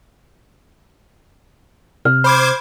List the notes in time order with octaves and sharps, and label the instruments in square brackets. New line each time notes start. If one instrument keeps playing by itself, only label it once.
[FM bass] C3 [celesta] F6
[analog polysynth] C5 D6 G#6 [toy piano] B5